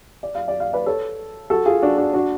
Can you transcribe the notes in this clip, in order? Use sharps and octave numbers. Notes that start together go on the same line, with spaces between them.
D5
F5
D5
F5
B4 D5
A4 C#5
F#4 A4
F4 G#4
D4 F#4
D4 F#4
D4 F#4